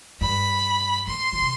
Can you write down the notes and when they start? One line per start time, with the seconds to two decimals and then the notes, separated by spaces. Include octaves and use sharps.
0.21 G2 B5
1.07 A2 C6
1.33 D3
1.42 C3